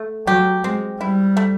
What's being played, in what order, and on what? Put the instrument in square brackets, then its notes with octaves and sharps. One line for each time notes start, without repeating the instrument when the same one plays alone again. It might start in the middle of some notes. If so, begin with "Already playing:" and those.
Already playing: [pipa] A3
[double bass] F#3 [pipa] G4
[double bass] G#3 [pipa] C4
[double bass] G3 [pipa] E4
[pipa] A3